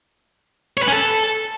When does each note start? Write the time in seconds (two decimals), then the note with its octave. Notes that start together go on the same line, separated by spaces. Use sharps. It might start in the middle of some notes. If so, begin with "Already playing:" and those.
0.77 C#5
0.82 B4
0.87 C#4
0.93 A4